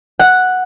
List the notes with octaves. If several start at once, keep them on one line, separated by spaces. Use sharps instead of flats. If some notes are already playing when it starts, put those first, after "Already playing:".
F#5